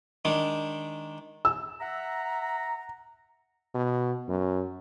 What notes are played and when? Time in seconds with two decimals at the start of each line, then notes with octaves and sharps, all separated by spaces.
0.25 D#3 G#3 D4
1.45 E6
1.80 E5 F#5 A#5
3.75 B2
4.29 F#2